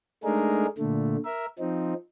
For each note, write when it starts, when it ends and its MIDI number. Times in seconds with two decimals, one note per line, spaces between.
0.24 0.66 56
0.24 0.66 57
0.24 0.66 62
0.24 0.66 63
0.24 0.66 68
0.24 0.66 70
0.78 1.17 46
0.78 1.17 50
0.78 1.17 57
1.25 1.46 70
1.25 1.46 76
1.59 1.94 53
1.59 1.94 60
1.59 1.94 63